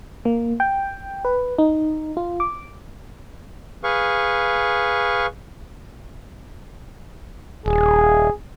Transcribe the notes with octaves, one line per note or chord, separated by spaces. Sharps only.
A#3
G5
B4
D#4
F4
D6
G#4 B4 F5 C#6
D#1 G#4